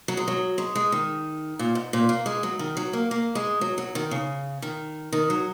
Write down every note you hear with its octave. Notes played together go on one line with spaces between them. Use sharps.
F#3
G#3
F#3
G#3
G#3
D#3
A#2
G#2
A#2
A#3
G#3
F#3
D#3
F#3
A#3
A#3
G#3
F#3
F#3
D#3
C#3
D#3
D#3
F#3